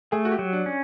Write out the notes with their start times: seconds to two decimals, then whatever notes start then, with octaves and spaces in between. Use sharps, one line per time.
0.12 A3 G#4
0.25 F#4
0.32 G4
0.39 F#3
0.53 D4
0.66 C#4